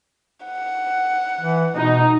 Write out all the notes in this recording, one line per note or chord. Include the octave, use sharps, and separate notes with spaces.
F#5
E3
B2 D#4